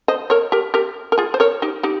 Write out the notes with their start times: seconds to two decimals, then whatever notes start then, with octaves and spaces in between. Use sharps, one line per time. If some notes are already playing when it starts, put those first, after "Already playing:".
0.08 C5 D#5
0.30 A#4 C#5
0.52 G4 A#4
0.74 G4 A#4
1.12 A#4
1.18 F4 G#4
1.34 C5
1.40 A#4 C#5
1.62 D#4 G4
1.83 D#4 G4